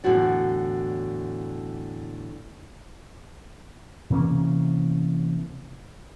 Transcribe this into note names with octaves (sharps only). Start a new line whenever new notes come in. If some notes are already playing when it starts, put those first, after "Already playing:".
E2 A2 D3 F#3 F#4 D5
C3 E3 A#3 C#4